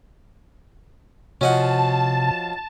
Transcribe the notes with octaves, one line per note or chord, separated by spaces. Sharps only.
C3 F3 C#4 F#4 D#5 F#5 A5